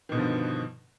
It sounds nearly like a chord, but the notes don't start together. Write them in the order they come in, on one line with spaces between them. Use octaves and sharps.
D#3 B2 D3 F3 G2